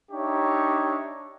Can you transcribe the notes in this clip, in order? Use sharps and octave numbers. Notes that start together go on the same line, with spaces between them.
D4 D#4 G4 C#5 E5